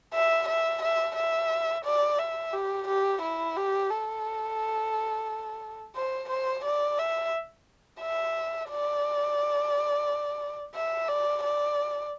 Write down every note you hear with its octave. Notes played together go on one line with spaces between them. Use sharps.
E5
E5
E5
E5
D5
E5
G4
G4
E4
G4
A4
C5
C5
D5
E5
E5
D5
E5
D5
D5